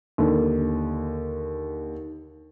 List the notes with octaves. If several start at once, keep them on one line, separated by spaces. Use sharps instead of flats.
D#2 D3